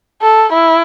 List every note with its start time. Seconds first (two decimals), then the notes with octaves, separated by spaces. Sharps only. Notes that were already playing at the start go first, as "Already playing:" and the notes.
0.22 A4
0.53 E4